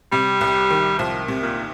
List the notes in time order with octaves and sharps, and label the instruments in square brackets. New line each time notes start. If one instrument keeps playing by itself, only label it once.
[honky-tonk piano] C3 [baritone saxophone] G3
[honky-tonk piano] C2
D#3
[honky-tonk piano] C2 [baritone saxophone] F3
[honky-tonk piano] C3
[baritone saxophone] A#2